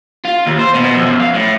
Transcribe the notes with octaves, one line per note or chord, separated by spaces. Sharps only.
F4
D#2
C5
B2
F2
F#2
F5
A2